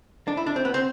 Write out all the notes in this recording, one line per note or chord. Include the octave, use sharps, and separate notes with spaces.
D4
E4
D4
C4
B3
C4